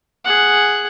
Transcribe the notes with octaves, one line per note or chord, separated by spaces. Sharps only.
G#4 F#5